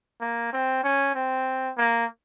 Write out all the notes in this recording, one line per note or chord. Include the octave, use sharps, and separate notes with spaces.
A#3
C4
C#4
C4
A#3